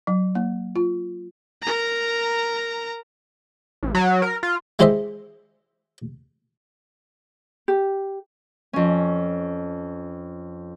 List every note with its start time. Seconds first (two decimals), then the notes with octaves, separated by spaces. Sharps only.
0.07 F#3
0.35 A#3
0.76 F4
1.63 A#4 A#5
3.83 A1
3.95 F#3
4.22 A#4
4.43 F4
4.79 G#3 E4 G4 C5 D#5 E5
7.68 G4
8.73 F2 C#4